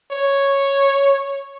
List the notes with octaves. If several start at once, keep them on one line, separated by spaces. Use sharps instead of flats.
C#5